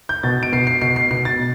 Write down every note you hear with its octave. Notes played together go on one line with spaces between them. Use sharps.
G6
B2 A6
D7
B2 C7
C7
B2 C7
C7
B2 C7
A6
B2